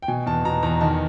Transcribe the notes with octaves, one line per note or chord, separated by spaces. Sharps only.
G5
B2 G#5
E2 A5
B2 A#5
E2 A#5
D#3 A5